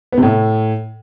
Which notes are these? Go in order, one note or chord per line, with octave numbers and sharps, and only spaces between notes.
B3
C3
A2